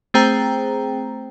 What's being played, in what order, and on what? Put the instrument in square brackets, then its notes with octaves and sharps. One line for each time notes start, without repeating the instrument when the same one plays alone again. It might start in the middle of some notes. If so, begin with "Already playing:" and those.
[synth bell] A3 C4 G#4 C5 G5 A#5